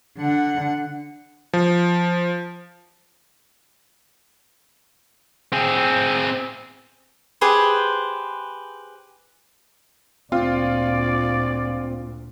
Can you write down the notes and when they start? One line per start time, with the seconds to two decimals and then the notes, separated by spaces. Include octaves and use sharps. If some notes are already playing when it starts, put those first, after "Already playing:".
0.18 D3 F#5
1.53 F3
5.52 C4 G#4
7.41 G4 G#4 B4 C5
10.32 D2 A#2 C4 F4 D5